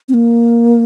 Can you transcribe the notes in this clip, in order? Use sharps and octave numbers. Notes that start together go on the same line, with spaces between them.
C4
A#3